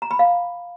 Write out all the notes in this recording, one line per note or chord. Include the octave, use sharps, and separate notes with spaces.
A#5
B5
F5